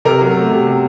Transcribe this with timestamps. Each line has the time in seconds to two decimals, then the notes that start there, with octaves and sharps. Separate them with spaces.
0.05 C3 A#4
0.21 F#3
0.36 A3
0.51 C3
0.67 C3